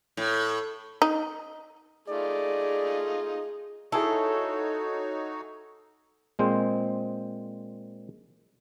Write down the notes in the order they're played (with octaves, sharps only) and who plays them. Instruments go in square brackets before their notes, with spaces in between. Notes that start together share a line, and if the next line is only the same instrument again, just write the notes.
[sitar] A2
[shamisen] D#4
[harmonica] A3 D#4 F4 [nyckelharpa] G#4 [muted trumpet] D5
[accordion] D#4 F#4 C#5 [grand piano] E4 G#4 [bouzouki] A4
[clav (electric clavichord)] A#2 G#3 C4 C5